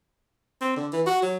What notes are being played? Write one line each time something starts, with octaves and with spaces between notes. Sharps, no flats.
C4
D3
E3
F#4
F#3